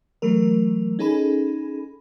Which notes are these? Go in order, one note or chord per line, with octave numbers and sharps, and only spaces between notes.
E3 F#3 A3 A#4
C#4 D#4 G#4 A4 B5